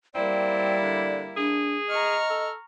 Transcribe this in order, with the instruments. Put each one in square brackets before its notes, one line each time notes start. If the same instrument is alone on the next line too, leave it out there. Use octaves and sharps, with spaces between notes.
[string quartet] G3 A#3 E4 [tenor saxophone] C4 [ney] D5
[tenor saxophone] D3
[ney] D4 [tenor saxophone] G#4
[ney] D#5 [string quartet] A#5 C#6 F6
[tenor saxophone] A4